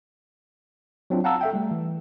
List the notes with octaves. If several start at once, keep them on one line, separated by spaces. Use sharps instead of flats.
F#3 C4 D4 F4
F5 F#5 A5 A#5 E6
A4 E5 G5
G3 A3
E3